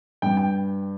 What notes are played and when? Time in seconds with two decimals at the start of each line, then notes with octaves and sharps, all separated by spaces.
0.22 G2 G3 G5
0.37 G5